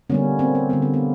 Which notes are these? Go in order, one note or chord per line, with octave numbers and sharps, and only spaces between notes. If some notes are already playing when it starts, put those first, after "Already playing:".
D3 G3 A#3 B3 C#4
A#3 C4
A#3
D3 G3 A#3 B3
A#3
B3